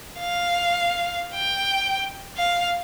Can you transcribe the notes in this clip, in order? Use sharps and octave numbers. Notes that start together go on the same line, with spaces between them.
F5
G5
F5